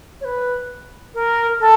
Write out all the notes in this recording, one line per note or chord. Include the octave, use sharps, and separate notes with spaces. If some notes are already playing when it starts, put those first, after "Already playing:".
C#5
B4
A#4
A4